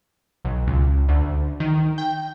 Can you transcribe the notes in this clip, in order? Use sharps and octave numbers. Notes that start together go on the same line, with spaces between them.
B1
C#2
D2
D#3
G5